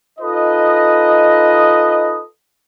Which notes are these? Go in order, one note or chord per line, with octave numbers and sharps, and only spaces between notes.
D#4 F4 A4 B4 D#5